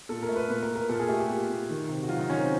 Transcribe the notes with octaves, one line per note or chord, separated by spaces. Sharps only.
A#2 A4
A#4
A3
B4
A#2 B4
A#4
A#2
A#4
A#2 A4
G#4
A3 G4
G4
A#2
A#2
D#3
C3
F#4
F#3 F4
D#4
D#3 C#4
C4